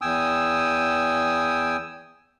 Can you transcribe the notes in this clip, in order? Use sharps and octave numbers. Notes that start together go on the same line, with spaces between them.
E2 G5 G#5 D#6 E6